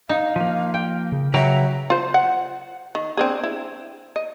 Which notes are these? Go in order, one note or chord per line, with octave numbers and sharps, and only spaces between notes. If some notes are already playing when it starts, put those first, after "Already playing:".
D#4 F5
F3 A#3
G5
C#3
C#3 F#3 B4 E5 G5 A#5
F4 C5
F#5
D#3
C4 D4 G#4
E4
D#5